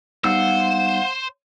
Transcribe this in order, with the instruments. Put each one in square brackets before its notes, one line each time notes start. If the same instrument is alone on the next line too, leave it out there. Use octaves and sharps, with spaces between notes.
[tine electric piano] G3 B3 D#4 [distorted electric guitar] C5 [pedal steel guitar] F5 F#5 E6